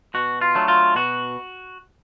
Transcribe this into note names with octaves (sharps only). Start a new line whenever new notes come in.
B2 F#4
F4
F#3 A3 D4
F4
B2 F#4